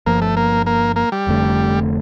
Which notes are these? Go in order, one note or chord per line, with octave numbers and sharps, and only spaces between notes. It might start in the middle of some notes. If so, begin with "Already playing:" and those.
G1 G2 F3 A#3
A3
A#3
A#3
A#3
G3
F1 F2 D3 A3